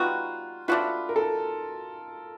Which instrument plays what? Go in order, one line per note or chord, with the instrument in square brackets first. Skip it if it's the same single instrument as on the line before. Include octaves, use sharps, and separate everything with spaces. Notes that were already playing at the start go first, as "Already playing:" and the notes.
Already playing: [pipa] G3 B3 D#4 F#4 [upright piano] F4
[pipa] A3 D4 F#4 B4 [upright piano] F4
[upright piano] A#4
A4